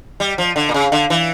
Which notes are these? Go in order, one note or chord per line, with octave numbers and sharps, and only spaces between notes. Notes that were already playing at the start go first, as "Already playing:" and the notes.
G3
F3
D3
A#2
C#3
D3
E3